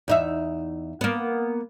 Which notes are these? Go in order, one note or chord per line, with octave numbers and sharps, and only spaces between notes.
E2 D#4 E5
A#3 B3